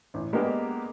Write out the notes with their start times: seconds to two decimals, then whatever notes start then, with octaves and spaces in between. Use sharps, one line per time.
0.14 A1
0.33 G#3 A#3 B3 D4 G4 A#4